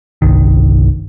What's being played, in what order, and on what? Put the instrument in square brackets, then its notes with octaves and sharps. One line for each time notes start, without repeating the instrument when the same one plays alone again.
[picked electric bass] G1 C2 D#3